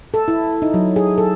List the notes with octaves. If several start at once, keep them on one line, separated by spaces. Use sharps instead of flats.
A4
E4
D#4
F#3
G#4
A4